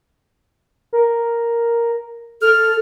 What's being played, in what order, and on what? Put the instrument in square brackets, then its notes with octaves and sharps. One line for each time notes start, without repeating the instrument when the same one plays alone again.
[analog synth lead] A#4
[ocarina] A4 [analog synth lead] F6